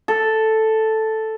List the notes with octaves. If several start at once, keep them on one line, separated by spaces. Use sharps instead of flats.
A4